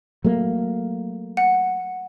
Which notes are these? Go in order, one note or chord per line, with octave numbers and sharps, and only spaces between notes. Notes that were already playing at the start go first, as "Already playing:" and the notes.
F#3 A3 A#3
F#5